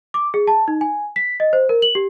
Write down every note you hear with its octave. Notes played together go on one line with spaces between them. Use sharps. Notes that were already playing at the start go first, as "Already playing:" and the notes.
D6
G#4
A5
D#4
G#5
B6
D#5
C5
A#4
F#7
G4